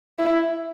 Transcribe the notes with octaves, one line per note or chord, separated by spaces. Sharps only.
E4